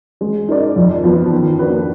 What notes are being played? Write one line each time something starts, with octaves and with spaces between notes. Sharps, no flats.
G#3
D#4 A#4 D5
F2
F3 B3 F4 B4
D#3
A#3 D4 F#4 B4